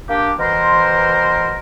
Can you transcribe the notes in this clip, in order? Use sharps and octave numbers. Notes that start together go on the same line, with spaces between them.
A#3 D4 G4
B2 E3 A#4 C5